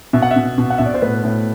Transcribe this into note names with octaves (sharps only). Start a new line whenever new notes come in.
B2 E5
F#5
E5
B2
B2
F#5
B2 E5
D5
C5
A2 B4
A2